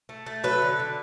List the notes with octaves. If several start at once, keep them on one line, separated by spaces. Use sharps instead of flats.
A3
A3
F#3 A4 B4
D3
D3